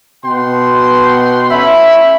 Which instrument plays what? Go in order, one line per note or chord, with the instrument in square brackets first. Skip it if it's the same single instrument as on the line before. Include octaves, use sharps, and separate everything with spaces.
[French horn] B2 [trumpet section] F#5 G5 C6
[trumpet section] A3 C#4 B5 [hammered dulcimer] E5